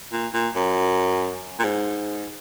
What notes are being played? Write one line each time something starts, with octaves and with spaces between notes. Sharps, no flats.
A#2
A#2
F#2
A#2
G#2